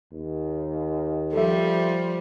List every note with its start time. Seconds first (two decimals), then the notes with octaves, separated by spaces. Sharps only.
0.12 D#2
1.33 F3 G3 A4 E5